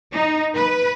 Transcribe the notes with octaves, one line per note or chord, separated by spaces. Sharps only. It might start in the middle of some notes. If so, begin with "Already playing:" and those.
D#4
B4